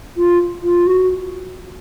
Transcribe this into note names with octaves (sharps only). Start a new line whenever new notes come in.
F4
F4
F#4